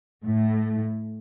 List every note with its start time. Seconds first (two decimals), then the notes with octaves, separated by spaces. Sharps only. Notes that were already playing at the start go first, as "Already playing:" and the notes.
0.25 A2 A3